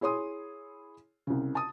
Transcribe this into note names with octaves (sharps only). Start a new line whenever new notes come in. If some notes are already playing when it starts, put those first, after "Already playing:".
E4 G#4 C#5 C6 D#6
C2 C#3
A5 D#6